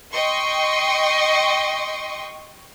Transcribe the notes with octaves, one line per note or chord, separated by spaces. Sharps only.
D#5 G5 C6 C#6